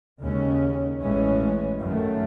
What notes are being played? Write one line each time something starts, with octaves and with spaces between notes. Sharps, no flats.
D#2 C#3 G#3 C#4
A1 A2 E3 G#3 C#4
F#2 D#3 A3